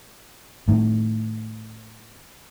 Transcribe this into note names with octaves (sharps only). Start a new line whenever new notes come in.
A2 D#3